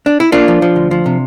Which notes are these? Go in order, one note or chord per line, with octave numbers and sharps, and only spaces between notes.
D4
E4
A#3 D4 F4
F3
F3
D2
F3
C3